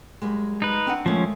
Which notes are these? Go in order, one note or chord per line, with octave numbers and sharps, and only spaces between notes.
F#2 G3 G#3
D#4 B4
C4 D4 F#5
D#3 F3 G#3 A3 C#4